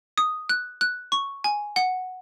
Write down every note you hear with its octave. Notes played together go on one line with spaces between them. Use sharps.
D#6
F#6
F#6
C#6
G#5
F#5